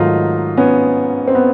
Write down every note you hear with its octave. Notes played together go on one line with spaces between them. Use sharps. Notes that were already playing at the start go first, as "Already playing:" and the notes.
Already playing: G#2 D#3 F#3 A3 D#4 F4
B3 C#4
C4
B3